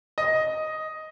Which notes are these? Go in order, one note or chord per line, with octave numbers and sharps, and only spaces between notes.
D#5